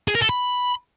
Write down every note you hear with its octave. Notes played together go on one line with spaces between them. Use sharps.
G#4
A#4
A4
B5